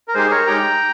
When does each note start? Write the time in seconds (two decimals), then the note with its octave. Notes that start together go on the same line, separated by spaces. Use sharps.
0.08 A#4
0.14 G#3 D#4 G4 G#4 C5
0.31 A#4 C#5
0.47 G#3 D#4 G4 G5 A#5